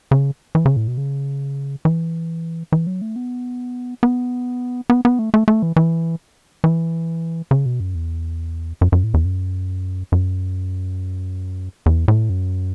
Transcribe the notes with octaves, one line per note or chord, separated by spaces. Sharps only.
C#3
E3
C#3
A2
B2
C#3
E3
E3
F#3
A3
B3
B3
B3
B3
A3
A3
A3
E3
E3
E3
C#3
B2
F#2
E2
F#2
F#2
A2
E2
F#2
F#2
E2
A2
F#2